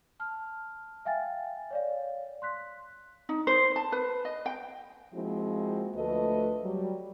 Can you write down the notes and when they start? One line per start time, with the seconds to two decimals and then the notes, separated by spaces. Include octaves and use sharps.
0.20 A5 F6
1.05 E5 F5 G5 G#5 A6
1.71 C#5 D5 F5
2.42 C6 F#6 B6
3.29 D#4
3.47 C5
3.76 A5
3.92 B4
4.25 D#5
4.46 G5
5.13 F3 G#3 A#3 C4 E4 F#4
5.95 D2 F3 A3 A4 B4 D#5
6.64 F#3 G3